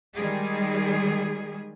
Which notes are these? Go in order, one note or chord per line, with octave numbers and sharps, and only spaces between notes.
D#3 G3 G#3 G#4